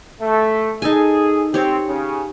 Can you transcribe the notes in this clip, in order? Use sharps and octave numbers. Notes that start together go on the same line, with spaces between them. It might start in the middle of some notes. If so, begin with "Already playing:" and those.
A3
D#4 G#4 A4 G#5
C4 G4 C#5
C#3 C#4